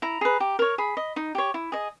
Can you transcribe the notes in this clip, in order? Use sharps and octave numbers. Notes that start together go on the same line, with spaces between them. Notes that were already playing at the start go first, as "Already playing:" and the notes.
E4 A#5
G#4 B4
G4
A#4 C#5
G#4 B5
D#5
D#4
G4 C#5
E4
G#4 D#5